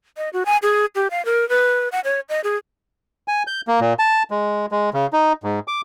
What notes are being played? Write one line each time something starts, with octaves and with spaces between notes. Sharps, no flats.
D#5
F#4
G#5
G#4
G4
F5
A#4
B4
F#5
C#5
D#5
G#4
G#5
G6
A#3
A#2
A5
G#3
G#3
C#3
D#4
G#2
D6